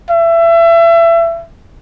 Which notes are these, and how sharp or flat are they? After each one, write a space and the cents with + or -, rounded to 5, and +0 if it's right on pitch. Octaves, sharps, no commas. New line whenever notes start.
E5 +30